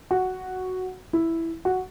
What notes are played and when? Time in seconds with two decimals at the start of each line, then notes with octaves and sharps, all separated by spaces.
0.11 F#4
1.13 E4
1.65 F#4